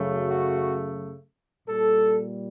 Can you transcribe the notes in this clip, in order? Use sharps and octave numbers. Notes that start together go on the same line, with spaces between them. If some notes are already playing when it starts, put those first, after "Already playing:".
Already playing: F#2 C#3 F#3 A3
F#4
A#2 G3 A4